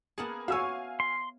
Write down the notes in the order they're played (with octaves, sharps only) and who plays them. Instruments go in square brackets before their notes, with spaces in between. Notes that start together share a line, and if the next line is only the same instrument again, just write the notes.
[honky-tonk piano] A#3 G#4 [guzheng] B3 F#5 A5
[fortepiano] F#4 E6 [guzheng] C#5 E5 [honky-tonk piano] F5 G#5
[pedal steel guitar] C6